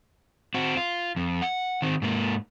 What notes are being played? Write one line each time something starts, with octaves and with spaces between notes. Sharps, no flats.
C4 F#4
F4
F2
F#5
D#3 C4
G#2 A#3